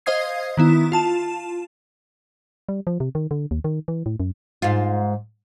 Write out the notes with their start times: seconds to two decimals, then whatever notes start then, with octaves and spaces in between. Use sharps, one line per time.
0.06 C5 D#5 F5 D#6 G#6 C7
0.57 D#3 B3 E4
0.92 F4 A5 E7
2.69 G3
2.87 F3
3.00 C3
3.15 D#3
3.31 D3
3.51 D#2
3.64 D#3
3.88 E3
4.06 A2
4.20 F#2
4.62 G#2 F4